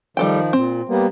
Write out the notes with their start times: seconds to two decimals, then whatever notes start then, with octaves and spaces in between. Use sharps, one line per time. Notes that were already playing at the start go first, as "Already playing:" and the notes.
0.17 D#3 F3 G3 A4 G5
0.53 A#2 C4
0.89 G3 A#3 B3